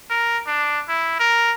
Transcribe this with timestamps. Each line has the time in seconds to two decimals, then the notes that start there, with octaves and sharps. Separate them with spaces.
0.10 A#4
0.47 D4
0.89 E4
1.20 A#4